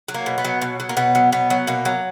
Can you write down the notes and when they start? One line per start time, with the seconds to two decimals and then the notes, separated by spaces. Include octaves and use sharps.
0.08 F#3
0.14 A#3
0.26 B2
0.38 B3
0.45 F#3
0.62 B2
0.80 F#3
0.89 A#3
0.97 B2 B3
1.15 F#3
1.32 B2 B3
1.50 F#3
1.67 B2 A#3
1.85 F#3